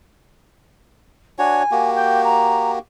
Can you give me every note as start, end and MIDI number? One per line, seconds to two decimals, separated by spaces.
1.39 1.63 62
1.39 1.63 66
1.39 1.63 73
1.39 1.90 80
1.71 2.79 58
1.71 2.79 66
1.71 2.79 67
1.95 2.21 79
2.24 2.71 82